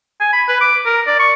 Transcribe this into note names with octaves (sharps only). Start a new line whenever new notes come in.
G#5
B5
B4
D6
A#4
D5
C#6